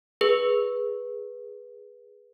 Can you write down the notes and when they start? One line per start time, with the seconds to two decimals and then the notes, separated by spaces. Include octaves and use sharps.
0.21 G#4 B4